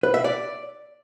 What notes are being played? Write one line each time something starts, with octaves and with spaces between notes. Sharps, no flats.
B4
E5
D5